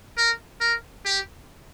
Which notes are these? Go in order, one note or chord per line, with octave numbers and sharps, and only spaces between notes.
A#4
A#4
G4